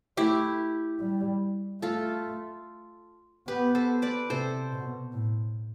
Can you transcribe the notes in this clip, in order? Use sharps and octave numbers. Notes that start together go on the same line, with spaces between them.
A3 E4 G4
G3
A3 F4 A4
B3 G4 B4
A4 C5
B4 D5
C3 A4 C5
B2
A2